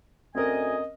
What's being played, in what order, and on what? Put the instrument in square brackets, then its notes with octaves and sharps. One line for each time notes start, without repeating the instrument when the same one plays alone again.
[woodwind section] D2 G#5 [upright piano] C4 C#4 A#4 [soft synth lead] D#5